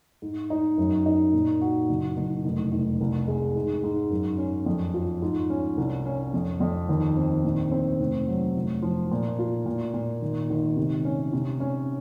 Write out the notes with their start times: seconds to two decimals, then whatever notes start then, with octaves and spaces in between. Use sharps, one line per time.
0.22 G#2
0.50 D#4
0.78 F#2
1.06 D#4
1.33 A#2
1.61 F#4
1.89 F#1
2.17 F#1
2.44 F1
2.72 F1
3.00 C2
3.28 G#3
3.56 G#2
3.83 G#2
4.10 F#2
4.38 C#4
4.66 F2
4.94 F4
5.22 G#2
5.50 C#4
5.77 C2
6.06 C#4
6.34 F2
6.60 F2
6.89 D#2
7.17 C4
7.44 A#1
7.72 C4
8.00 F1
8.28 F#3
8.56 F1
8.82 F3
9.11 A#2
9.39 F4
9.66 A#2
9.94 A#2
10.22 G#1
10.50 G#1
10.77 C3
11.05 C#4
11.33 C3
11.60 C#4